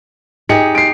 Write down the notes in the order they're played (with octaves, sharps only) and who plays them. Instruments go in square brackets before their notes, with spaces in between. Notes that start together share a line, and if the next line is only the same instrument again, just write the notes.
[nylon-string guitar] D#4 G4 G#4 [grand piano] C#7
[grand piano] C7 D7